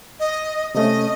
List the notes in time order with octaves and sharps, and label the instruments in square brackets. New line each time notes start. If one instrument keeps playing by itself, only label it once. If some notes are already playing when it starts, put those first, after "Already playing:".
[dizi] D#5
[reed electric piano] C3 A3 C#4 [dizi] D#5